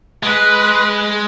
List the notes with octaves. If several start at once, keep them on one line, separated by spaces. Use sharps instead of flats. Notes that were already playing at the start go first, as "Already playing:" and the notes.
G#3 B4